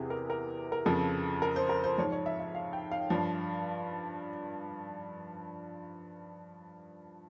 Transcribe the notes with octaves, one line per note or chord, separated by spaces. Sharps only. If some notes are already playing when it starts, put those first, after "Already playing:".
Already playing: E2 C3 E3 G4 G#4
A#4
A#4
A#4
F2 C#3 F3
A#4
C5
A#4
C5
G#2 F3 C#5
C#5
E5
E5
F5
G5
F5
G2 F3